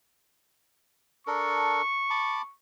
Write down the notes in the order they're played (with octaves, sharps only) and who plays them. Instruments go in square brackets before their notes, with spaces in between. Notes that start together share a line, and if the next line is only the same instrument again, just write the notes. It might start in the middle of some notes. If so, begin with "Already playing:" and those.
[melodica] D4 A4 A#4 [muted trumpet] C#6
[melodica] A5 B5 D6